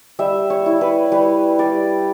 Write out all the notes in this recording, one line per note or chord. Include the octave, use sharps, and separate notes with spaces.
G3 E5
C#5
E4
B4
G3 B4
G3 D5